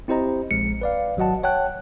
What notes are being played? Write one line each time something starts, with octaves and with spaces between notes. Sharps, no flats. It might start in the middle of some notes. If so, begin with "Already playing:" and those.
C4 E4 G4 C5 D#5 A#5
A#1 G#3 C#7
B4 D5 F5
G#1 F#3 F#4 D#5 F#5 A5
C#5 F#5 G5 A5 F#6